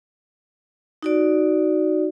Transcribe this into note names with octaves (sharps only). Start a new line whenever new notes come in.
D#4 F#4 D5